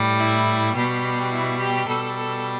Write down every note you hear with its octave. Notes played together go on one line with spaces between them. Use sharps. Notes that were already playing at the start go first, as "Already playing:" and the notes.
Already playing: A2 G3
E4
B2 G3 G4
E4
G4
B2 G3 A4
A4